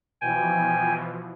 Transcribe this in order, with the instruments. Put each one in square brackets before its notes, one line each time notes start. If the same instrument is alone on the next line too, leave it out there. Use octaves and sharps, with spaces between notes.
[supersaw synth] B2 E3 F3 [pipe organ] G5 G#5